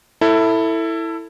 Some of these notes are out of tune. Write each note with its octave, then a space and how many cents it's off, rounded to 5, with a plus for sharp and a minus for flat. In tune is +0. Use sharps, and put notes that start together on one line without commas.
E4 +0 A4 +20